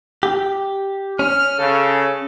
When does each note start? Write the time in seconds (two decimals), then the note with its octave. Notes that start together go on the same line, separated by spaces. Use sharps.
0.23 G4
1.19 C#4 F6
1.59 C#3 A4